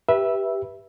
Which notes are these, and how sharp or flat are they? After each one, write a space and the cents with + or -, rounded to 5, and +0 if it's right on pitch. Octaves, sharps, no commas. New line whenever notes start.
G4 +0 B4 -20 E5 +0